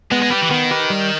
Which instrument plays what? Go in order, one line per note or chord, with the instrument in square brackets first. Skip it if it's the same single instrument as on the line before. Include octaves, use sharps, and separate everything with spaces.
[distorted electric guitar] G#3 [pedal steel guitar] B3
[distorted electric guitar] G#3
[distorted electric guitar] G3 [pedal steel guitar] G4 B4
[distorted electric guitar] E3
[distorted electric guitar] D#3 [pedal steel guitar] B3
[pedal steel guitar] G4 B4
G3